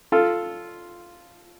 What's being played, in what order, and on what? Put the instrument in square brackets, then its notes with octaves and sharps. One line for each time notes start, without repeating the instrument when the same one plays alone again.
[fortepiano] F4 A4